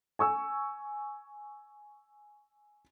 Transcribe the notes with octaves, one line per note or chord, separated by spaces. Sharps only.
G#5 C#6 E6